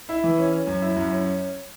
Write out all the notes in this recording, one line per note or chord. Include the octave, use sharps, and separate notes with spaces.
E4
E3
C#4
C#4
F#2
E4
F#2
C#4